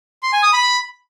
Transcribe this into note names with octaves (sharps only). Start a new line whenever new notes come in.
C6
G#5
D#6
B5